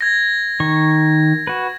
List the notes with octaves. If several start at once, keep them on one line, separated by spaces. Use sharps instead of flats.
G#6 A#6
D#3 C#6
F#4 B4